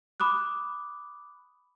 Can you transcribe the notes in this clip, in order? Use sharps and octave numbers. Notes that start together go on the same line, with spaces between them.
B5 D6 D#6 F#6